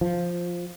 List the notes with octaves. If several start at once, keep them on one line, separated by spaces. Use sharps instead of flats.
F3